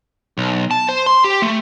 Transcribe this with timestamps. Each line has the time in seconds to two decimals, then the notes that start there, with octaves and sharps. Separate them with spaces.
0.38 B1
0.71 A5
0.89 C5
1.06 C6
1.24 G4
1.42 A3